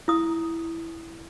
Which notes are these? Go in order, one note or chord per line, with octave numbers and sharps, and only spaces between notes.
E4 D#6